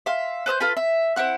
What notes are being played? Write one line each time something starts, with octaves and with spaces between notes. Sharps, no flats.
E5 F5 C6
B4 C5 E6 G6
F4 A4 B4 B5
E5
C4 E4 F#5 F#6